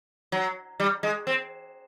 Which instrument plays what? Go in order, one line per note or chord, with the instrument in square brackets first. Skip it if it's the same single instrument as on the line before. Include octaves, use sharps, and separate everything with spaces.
[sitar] F#3
G3
G#3
C4